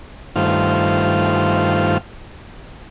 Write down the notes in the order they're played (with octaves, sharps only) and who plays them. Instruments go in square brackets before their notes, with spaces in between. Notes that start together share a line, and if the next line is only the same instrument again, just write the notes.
[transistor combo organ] G2 D#3 A3 F4 C5 F6